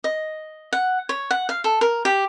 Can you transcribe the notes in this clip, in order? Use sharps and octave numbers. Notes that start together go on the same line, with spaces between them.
D#5
F#5
C#5
F#5
F5
A4
A#4
G4